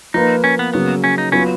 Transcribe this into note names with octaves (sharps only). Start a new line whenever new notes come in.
F3 A#3 D#4 F4 B4
C#4
B3
C#3 F#3 A#3 B3
C#4
D#4
F#3 B3 C#4 F4 B4